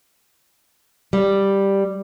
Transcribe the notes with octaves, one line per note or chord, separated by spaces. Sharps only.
G3